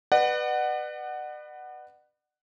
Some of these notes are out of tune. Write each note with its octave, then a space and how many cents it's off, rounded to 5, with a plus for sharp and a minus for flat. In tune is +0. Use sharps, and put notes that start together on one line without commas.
B4 +0 D5 +45 F#5 +10